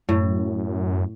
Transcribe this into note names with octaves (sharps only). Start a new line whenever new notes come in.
F#2 A2